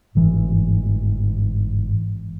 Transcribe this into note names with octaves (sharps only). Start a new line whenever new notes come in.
G1 G#2 E3